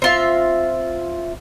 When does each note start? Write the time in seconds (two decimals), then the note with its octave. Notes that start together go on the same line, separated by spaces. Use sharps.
0.02 C4 F4 E5